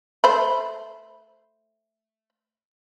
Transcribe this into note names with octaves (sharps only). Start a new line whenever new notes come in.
A3 C5 B5